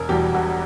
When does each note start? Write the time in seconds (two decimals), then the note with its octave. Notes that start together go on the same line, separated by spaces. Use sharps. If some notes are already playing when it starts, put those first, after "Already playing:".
Already playing: E1 A#4
0.09 E2 B2 G3 G4
0.34 E1 F#4